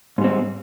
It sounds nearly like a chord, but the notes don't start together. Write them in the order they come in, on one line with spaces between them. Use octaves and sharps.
G#2 G3 C4